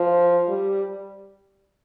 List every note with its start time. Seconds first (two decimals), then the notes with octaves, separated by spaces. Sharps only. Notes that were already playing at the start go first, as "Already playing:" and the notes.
Already playing: F3
0.48 G3